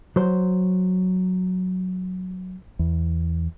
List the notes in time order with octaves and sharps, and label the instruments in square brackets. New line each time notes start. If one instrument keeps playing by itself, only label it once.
[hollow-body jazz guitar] F#3 C5
[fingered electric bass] E2